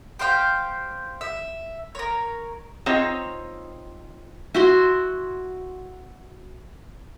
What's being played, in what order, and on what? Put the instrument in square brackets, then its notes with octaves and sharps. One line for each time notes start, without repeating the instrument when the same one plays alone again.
[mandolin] G4 C5 F5 G5
E5
A#4 C#5
[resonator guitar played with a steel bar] C4 D#4 F4 C#5
[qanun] E4 F#4 C6